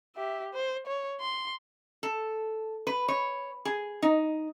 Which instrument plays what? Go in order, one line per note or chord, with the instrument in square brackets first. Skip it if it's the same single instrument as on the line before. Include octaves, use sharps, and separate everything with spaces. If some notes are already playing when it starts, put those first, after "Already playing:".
[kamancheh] G4 E5
C5
C#5
C6
[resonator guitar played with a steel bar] A4
B4
C#5
G#4
D#4